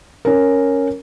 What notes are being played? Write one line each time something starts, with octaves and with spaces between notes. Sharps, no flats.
C#4 A#4